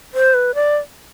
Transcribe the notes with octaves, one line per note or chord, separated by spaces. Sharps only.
C5
B4
D5